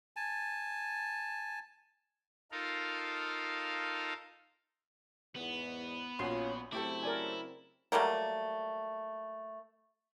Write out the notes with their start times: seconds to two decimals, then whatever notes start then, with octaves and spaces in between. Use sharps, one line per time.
0.16 G#5 A5
2.52 D#4 F4 A4 A#4 F5
5.36 E2 G#2 B3 B4
6.19 A#1 C#4 F4 F#4 C#5 C6
6.72 C#3 F#3 A3 C4 E4 G4 A4 D6
7.03 A#4 D5 G#5
7.92 F#3 G3 A3 A#3